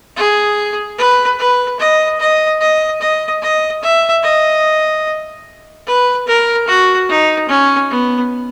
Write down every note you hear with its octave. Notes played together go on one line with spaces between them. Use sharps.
G#4
B4
B4
D#5
D#5
D#5
D#5
D#5
E5
D#5
B4
A#4
F#4
D#4
C#4
B3